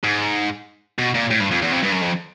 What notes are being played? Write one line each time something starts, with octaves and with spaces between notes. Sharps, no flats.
G#2
B2
A#2
A2
G2
F2
E2
F2
G2
F#2
F2